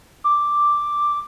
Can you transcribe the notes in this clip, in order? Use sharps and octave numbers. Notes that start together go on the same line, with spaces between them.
D6